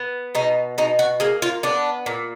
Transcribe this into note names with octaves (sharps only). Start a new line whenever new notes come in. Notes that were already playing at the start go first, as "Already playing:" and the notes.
Already playing: B3
B2 D#4
B2 D#4
F#4
A#3 G#4
F4
B3 D4
A#2